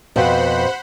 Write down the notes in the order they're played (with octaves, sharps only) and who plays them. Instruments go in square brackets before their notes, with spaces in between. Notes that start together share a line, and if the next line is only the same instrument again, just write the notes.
[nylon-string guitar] F2 B2 [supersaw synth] C5 F#5 B5